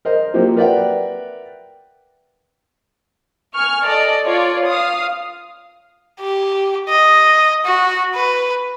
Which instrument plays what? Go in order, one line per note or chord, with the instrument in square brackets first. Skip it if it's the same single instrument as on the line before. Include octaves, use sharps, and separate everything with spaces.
[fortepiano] A#4 C5 D#5
F3 F#3 A#3 C4 G4
A#4 B4 D5 E5 F#5 G5
[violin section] G#5 C#6 F6
A4 D5 D#5
F4 C#5 D5
F5 D#6
[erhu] G4
D#5
F#4
B4